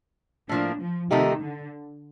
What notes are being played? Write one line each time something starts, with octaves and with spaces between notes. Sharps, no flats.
A2 F3 A#3 D4
F3
C3 D#3 F3 A3 D#4 G4
D3